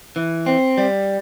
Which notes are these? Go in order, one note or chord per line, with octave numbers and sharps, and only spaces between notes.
E3
C4
G3